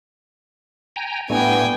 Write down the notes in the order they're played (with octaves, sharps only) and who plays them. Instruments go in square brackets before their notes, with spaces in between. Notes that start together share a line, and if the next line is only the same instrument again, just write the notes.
[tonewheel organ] G5 G#5 A#5
[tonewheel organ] A2 G3 A3 [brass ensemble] B3 D4 [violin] G5 G#5